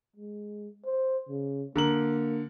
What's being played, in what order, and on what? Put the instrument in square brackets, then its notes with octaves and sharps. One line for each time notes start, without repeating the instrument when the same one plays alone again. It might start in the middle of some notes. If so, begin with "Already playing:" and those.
[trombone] G#3
C5
C#3
[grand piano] D3 A#4 F#7 [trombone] A#3